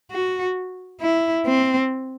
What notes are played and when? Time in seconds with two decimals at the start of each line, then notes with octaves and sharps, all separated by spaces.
0.11 F#4
1.01 E4
1.46 C4